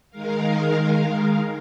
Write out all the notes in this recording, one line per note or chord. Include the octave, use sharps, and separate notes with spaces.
D#3 G#3 A#4 F5